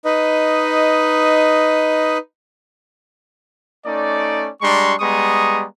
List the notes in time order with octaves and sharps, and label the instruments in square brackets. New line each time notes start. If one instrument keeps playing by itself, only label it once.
[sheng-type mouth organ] D#4 B4 D#5
[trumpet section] A3 C#4 D#4 D5
G3 G#3 D4 A#5 C6 C#6
G3 G#3 B3 A#5 C#6 D#6